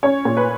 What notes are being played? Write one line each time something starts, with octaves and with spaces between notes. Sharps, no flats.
C#4 C#5
A#2
B4